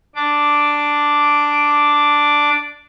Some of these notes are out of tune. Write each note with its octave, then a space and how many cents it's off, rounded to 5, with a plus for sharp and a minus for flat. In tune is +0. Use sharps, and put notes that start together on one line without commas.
D4 +0 D6 +0